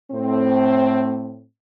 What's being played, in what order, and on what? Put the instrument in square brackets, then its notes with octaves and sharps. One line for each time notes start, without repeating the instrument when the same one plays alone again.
[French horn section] A2 C4